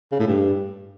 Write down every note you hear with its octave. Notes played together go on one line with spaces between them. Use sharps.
C#3
A2
G2